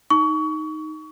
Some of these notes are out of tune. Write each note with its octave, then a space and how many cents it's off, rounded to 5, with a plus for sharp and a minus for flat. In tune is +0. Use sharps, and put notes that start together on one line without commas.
D#4 +5 C#6 +25